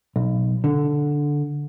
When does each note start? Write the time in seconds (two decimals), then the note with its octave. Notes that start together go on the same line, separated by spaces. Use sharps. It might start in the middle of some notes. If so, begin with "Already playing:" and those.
0.16 B1
0.64 D3